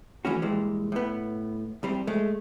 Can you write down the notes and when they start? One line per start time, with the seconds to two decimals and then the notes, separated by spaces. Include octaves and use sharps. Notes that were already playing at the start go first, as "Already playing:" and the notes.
0.25 E3 A3 C#4 F#4
0.42 G2 A#2 E3 G#3
0.92 A2 B3
1.83 C2 G3 C4
2.07 G#3 A3